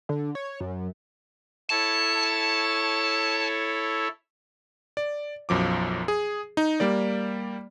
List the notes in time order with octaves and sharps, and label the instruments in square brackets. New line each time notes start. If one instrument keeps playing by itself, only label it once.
[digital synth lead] D3
C#5
F#2
[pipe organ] E4 A4 C#5 [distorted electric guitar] A5
[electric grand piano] D5
B1 F#2 F3 D6
G#4
D#4
G3 A#3 D5